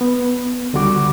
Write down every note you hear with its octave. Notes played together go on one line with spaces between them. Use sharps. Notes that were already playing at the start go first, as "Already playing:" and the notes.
B3
C#2 D3 G3 F#4 D6